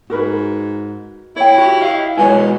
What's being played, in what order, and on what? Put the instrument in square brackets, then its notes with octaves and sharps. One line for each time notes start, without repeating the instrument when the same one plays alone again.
[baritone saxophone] G#2 [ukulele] F#4 A#4 B4
[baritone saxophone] E4 [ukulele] C#5 G5
[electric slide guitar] F#4 G4
D#5 F5
[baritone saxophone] B2 [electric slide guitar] F#3 G#3 E4 [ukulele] C#5 G#5